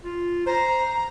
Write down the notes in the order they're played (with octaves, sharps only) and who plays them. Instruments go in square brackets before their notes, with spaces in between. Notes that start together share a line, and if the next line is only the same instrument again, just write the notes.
[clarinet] F4
[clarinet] C5 [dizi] A#5